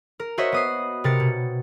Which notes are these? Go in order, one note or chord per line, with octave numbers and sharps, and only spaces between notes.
A#4
F#4 C5 C#5 D#5 E5
B3 D#6 C7
C3 A#4 A6 C#7
B2